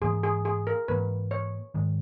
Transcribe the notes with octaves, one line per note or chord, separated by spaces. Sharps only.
G#2 E3 A#3 G#4
G#4
G#4
A#4
G#2 E3 A#3 B4
C#5
G#2 D#3 G#3